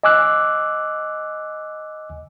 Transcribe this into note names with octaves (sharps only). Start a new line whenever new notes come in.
D#5 G#5 D6 E6 F#6